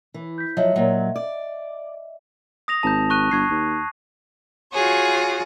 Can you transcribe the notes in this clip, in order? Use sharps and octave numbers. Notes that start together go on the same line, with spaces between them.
E3
G6 B6
F3 F#3 D#5 E5
A#2 F#3
D5
D#6 A#6 F7
G#1 A5 A#5 G6
C#6 F#6 D#7
G1 C#6 G#6 C7
D#2
F4 F#4 G#4 C#5